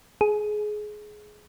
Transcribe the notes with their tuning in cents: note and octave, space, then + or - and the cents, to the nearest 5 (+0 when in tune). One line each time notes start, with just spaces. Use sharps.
G#4 +20